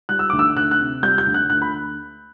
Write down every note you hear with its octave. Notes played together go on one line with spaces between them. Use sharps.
G3 F#6
E6
D2 D6
E6
D2 F#6
F#6
C3
G3 G6
G6
D2
F#6
D2 F#6
B5